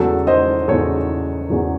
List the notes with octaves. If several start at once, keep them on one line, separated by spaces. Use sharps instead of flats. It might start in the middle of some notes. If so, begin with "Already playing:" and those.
Already playing: E2 C#3 F#3 F#4 A4
C5 D#5
E2 C#3 F#3 A4 C#5
E2 C#3 F#3